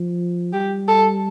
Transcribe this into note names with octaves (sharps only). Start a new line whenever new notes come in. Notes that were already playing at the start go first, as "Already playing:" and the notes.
Already playing: F3
G3 G4
A4